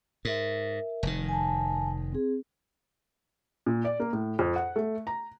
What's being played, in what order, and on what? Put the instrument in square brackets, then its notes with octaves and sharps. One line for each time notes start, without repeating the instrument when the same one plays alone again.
[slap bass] G#2 [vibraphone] A#4 E5
[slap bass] F1 D#3
[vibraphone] G#5 A5
C4 G#4
[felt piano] A#2
D5
A#3
A2
F2
F#5
A3
A#5